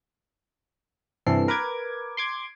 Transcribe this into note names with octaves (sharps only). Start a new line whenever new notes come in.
G2 C3 E3 A4 C7
A#4 B4 D6 G#6
C6 D6 G#6